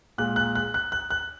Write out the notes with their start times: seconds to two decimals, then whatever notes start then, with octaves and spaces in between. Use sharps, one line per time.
0.18 A#2 G#3 F#6
0.36 F#6
0.55 F#6
0.74 F#6
0.92 F#6
1.10 F#6